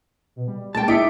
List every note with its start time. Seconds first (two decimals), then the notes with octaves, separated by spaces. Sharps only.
0.36 B2
0.48 G3
0.75 G#3 A#3 G5 A5
0.88 D#4 E4 D6 B6 C#7 D7